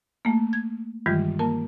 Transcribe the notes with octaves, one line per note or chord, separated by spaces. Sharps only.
A3 A#3
G#6
G2 D#3 E3 G3 G#3 F4
A#3 A#4 A5